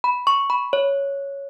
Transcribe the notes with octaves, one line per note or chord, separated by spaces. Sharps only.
B5
C#6
B5
C#5